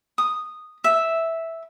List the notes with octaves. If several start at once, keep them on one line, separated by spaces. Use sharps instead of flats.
D#6
E5